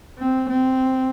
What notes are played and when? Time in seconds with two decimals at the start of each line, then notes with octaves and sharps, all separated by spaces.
0.19 C4
0.49 C4